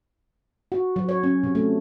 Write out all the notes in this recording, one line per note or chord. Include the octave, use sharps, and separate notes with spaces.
F#4
F#3
C#5
C#4
C3
A3